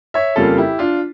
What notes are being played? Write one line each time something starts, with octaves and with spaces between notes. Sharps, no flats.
C#5 E5
F2 C#3 G3 A#3 F4 A4
E4 G4
D4 F4